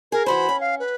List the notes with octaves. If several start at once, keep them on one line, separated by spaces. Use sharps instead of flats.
G#4 A#4
E3 F#4 C5 B5
C#4
F5
B4